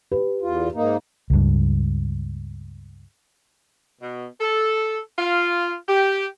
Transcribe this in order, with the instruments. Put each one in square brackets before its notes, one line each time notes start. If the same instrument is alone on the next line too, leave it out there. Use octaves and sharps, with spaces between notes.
[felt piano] G4 B4
[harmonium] E2 F4
G#2 A#3 D#4
[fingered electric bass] C#2 G2
[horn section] B2
A4
F4
G4